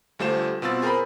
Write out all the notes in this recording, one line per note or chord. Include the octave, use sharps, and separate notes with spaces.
D2 G3 A3 F4 C5 E7
B2 C4 F4 E6 A6
G#4 A#4 C5 G5 B5